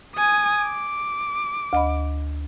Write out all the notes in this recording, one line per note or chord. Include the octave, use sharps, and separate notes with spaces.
G#5 D#6
D6
D2 D#5 B5